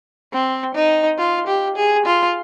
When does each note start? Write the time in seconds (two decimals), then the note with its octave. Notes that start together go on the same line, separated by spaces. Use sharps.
0.33 C4
0.75 D#4
1.18 F4
1.47 G4
1.76 G#4
2.05 F4